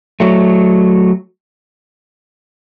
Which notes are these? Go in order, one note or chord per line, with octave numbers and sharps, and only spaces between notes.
F#3 A3